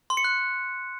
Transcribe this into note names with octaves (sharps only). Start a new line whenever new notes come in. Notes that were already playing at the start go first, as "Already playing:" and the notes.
C6
C#7
F#6